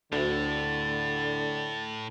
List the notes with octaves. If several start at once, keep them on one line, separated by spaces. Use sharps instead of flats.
D2 A2 D3 A6